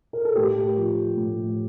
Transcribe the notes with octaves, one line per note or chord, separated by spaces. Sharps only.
A#4
A4
A2 G4
F3
A2